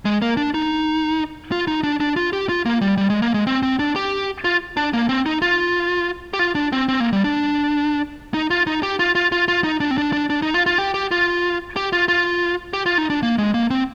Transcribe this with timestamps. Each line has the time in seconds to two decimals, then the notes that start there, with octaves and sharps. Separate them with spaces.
0.05 G#3
0.22 A#3
0.37 D4
0.54 D#4
1.52 F4
1.67 D#4
1.83 D4
2.00 D4
2.16 F4
2.33 G4
2.49 F4
2.65 A#3
2.81 G3
2.97 G3
3.10 G#3
3.22 A#3
3.34 G#3
3.47 C4
3.63 C4
3.79 D4
3.96 G4
4.44 F4
4.77 D4
4.93 A#3
5.09 C4
5.26 D#4
5.42 F4
6.33 G4
6.39 F4
6.55 D4
6.72 C4
6.88 C4
7.00 A#3
7.13 G3
7.24 D4
8.34 D#4
8.50 F4
8.67 D#4
8.83 G4
8.99 F4
9.15 F4
9.32 F4
9.48 F4
9.64 D#4
9.80 D4
9.91 C4
9.98 D4
10.13 D4
10.30 D4
10.42 D#4
10.54 F4
10.66 F4
10.78 G4
10.94 G4
11.11 F4
11.76 G4
11.92 F4
12.08 F4
12.73 G4
12.86 F4
12.98 D#4
13.10 D4
13.23 A#3
13.38 G#3
13.54 A#3
13.70 C4